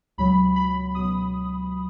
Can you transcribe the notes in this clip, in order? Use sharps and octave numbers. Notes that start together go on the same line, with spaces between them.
C#2 B2 F#3 B5
B5
C#2 B2 F#3 D#6